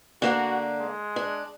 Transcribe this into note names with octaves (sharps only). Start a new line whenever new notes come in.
D3 A#3 D4 F#4
G#3
D4